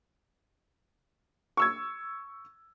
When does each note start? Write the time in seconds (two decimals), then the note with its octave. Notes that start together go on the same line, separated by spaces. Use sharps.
1.57 C#6 E6 G#6